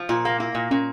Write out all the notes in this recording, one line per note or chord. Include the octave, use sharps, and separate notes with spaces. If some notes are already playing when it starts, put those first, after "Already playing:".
Already playing: F3
A#2 F4
A#3
A#3 E4
A#2
A#2 C#4